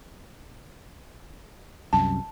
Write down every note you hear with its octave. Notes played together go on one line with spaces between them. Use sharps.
C2 F#2 A5